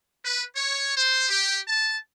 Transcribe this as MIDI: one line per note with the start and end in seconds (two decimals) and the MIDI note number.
0.24 0.43 71
0.56 0.92 73
0.96 1.27 72
1.29 1.59 67
1.66 1.97 81